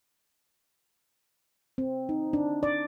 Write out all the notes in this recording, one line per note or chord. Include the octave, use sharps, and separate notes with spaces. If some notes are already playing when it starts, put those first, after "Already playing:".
C4
D#4
D4
D5